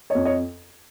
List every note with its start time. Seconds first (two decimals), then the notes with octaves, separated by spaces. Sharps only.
0.10 F2 C#5 D#5
0.25 C#5 D#5